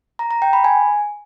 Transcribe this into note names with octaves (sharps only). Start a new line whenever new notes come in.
A#5
A#5
G5
B5
G#5